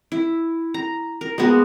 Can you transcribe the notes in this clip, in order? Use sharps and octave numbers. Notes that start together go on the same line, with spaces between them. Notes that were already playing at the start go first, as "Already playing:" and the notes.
E4
A#5
A#4
G#3 A#3 B3 F#4